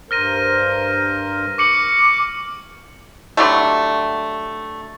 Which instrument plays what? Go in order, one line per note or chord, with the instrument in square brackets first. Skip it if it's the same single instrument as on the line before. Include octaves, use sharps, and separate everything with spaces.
[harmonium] G2 A#4 C5 [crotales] F6 A#6 D#7
[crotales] C#6 C#7 F#7 [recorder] D6
[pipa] D3 F#3 G3 A3